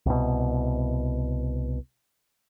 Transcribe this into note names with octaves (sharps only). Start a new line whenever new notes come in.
C2 B2